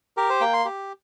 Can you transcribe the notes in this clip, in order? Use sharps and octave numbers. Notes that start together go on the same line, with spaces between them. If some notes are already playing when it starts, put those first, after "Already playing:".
G4 A#4
C5
A#3 G5
C6
G4